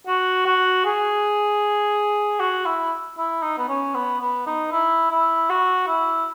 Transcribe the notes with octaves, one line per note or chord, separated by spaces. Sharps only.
F#4
F#4
G#4
F#4
E4
E4
D#4
B3
C#4
B3
B3
D#4
E4
E4
F#4
E4